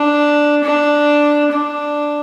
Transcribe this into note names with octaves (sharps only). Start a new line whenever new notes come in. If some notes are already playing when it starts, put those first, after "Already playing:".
Already playing: D4
D4
D4